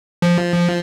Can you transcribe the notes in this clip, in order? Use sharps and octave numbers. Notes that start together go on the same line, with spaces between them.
F3